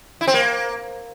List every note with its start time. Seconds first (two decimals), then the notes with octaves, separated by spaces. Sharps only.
0.21 E4
0.27 C4
0.34 A#3